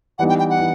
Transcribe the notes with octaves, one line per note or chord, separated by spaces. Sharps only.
E3 G3 B3 D#4 F#5
G5
G5
F#5
E3